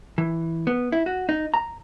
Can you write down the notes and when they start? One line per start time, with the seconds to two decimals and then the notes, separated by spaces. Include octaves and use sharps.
0.18 E3
0.67 B3
0.92 E4
1.06 F#4
1.29 D#4
1.54 A#5